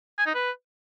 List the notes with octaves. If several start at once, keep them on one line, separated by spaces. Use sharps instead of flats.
G#5
D#4
B4